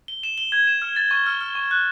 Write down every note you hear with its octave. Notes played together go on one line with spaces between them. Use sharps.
G7
E7
G7
G#6
E7
F6
A6
C#6
F6
F6
C#6
F#6